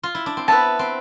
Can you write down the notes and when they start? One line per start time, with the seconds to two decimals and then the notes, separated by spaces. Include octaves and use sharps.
0.03 F4
0.15 E4
0.26 D4
0.37 C4
0.48 B3 B4 E5 A5
0.79 C4